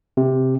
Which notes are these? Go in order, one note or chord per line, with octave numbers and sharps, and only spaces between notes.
C3